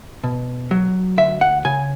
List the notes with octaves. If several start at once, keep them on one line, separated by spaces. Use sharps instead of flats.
B2
F#3
D2 E5
F#5
C#3 G#5